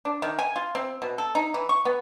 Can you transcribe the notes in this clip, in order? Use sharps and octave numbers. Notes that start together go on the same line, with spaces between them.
D4
D#3
G#5
F4
C4
B2
A4
D#4
E3
C#6
B3